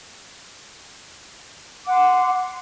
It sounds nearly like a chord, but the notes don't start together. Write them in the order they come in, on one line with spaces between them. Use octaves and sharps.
D6 F#5 C6